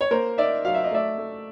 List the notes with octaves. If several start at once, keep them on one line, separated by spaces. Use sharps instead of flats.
C#5
A#3 A#4 C5
D#4 D5 E5
F#3 F5
E5
D#5
A3 D5 E5
A3